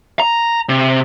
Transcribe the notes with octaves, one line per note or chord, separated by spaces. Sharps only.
A#5
C3